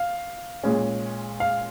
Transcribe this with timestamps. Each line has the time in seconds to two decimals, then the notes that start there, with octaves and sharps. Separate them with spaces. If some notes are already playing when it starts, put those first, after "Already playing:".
Already playing: F5
0.64 A#2 G#3 C#4
1.40 F5